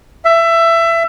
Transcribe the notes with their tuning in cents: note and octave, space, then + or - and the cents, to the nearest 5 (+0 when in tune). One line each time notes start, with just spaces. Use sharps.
E5 +20